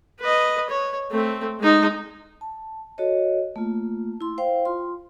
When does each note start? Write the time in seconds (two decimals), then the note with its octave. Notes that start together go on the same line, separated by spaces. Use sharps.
0.20 B4 D#5
0.70 C#5
1.11 A3 C4
1.60 G#3 D#4
2.41 A5
2.98 F#4 A4 C#5 D#5
3.56 A3 A#3 F4
4.21 E4 C6
4.38 C5 F5 G5
4.65 F4 C6